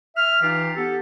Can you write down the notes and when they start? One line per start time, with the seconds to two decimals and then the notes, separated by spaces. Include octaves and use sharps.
0.16 E5 F6
0.42 E3 D#4 F4 G4
0.76 B3 G4 A4